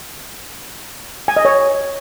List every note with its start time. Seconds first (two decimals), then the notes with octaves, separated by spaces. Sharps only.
1.28 G#5
1.37 D#5
1.45 C#5